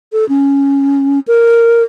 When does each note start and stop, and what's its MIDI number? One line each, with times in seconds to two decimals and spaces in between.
0.13 0.27 69
0.29 1.20 61
1.28 1.83 70